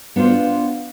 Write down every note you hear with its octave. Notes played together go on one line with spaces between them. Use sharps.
B3 D4 F4 C5